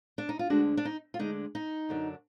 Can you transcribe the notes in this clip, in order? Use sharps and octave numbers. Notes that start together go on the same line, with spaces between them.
D4
D#4
F4
D2 D3 G#3 D4 F#4
D4
D#4
F4
D2 D3 G#3 D4 D#4
D#4
F#2 D3 F#3 D4